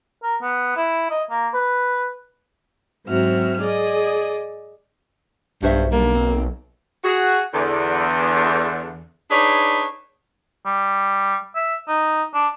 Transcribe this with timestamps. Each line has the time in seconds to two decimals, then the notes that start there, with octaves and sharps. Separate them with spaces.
0.23 A#4
0.42 B3
0.76 E4
1.10 D#5
1.30 A#3
1.54 B4
3.06 G#2 F#3 C4 F#4 E5 F6
3.60 G#4 D5 D#5
5.62 B1 G2 F#4 C5 E5
5.92 D3 G3 A#3
6.15 C4
7.04 F#4 G#4
7.54 E2 D3
9.31 D4 D#4 G#4 B4 C#5 D5
10.66 G3
11.56 E5
11.88 D#4
12.34 D4